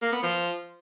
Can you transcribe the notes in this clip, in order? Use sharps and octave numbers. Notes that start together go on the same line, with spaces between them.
A#3
B3
F3